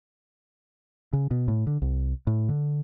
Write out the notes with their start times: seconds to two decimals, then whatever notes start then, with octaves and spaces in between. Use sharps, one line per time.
1.13 C#3
1.31 B2
1.48 A2
1.67 D3
1.82 C2
2.27 A2
2.49 D3